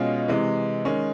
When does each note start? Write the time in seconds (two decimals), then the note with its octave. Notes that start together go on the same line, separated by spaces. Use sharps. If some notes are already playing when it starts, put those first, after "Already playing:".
Already playing: B2 G#3 C#4 F4
0.28 C3 E3 G#3
0.85 D#3 G#3 C#4